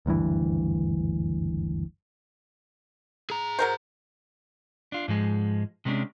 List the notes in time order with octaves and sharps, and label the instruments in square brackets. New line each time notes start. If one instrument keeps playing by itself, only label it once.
[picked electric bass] F#1 D2 G2 E3
[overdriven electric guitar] G#4 A#5
[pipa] F#3 A#4 C5
[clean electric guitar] D4 F4
G#2 F3 G#3
C3 G#3 B3 C#4 D4